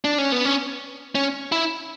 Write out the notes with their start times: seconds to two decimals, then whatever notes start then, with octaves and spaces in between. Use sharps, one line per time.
0.05 D4
0.18 C#4
0.32 B3
0.45 C#4
1.15 C#4
1.52 E4